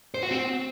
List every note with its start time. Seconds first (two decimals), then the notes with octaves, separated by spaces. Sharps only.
0.14 C5
0.23 F#4
0.31 C4